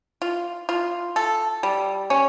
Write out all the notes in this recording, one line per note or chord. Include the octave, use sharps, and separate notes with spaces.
F4
F4
A4
G3
C#4